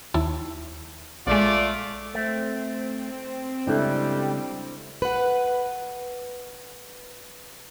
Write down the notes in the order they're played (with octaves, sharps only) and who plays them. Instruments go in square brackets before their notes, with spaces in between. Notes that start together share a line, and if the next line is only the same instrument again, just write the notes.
[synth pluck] D#2 E4 A5
[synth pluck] A#1 G#3 [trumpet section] A3 F4 D5
[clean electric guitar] A3 [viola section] C4
[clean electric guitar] C#2 [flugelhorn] G3 [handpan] D4 E4 A4
[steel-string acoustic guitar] B4 F#5